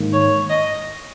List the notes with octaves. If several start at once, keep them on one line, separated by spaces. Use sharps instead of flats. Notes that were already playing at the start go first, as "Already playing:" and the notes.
Already playing: G#2 D#3 A#3
C#5
D#5